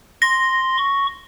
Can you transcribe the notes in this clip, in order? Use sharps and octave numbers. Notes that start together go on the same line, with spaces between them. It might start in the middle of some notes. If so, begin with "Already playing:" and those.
C6 A#6
C#6